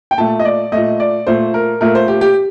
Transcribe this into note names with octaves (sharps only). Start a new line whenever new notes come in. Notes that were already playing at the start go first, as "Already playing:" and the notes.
G5
A#2 A3 A5
D#5
D5
A#2 A3 D#5
D5
A#2 A3 C5
A#4
A#2 A3 A#4
C5
G4
G4